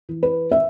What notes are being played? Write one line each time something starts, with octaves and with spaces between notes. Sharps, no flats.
E3
B4
E5